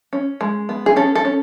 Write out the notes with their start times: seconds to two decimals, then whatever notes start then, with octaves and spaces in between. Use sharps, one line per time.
0.13 C#4
0.41 G#3
0.69 B3
0.86 G#4
0.96 C#4 A4
1.15 A4
1.25 C#4